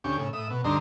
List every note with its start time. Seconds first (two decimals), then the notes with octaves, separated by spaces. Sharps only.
0.04 D2 C#4 G4
0.18 A2 C#3
0.33 A2 E5 D#6
0.50 B2
0.64 D2 G2 D3 D#4 A#5 C6